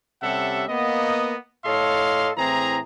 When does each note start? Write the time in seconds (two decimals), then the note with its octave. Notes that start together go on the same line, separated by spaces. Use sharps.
0.23 C3 G3 C#4 A4 E5 F#5
0.69 A#3 B3 D#5
1.65 A2 A4 C#5 D#5 F5 C6
2.37 A2 E3 C4 G#4 A#5